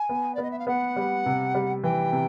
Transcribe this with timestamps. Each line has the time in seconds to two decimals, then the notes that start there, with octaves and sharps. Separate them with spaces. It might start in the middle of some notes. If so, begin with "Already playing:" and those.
Already playing: G#5
0.09 B3
0.34 D5
0.38 B3 D#5
0.50 E5
0.58 F5
0.67 B3 F#5
0.96 G3
1.26 C3
1.55 G3
1.83 E3 G5
2.12 C3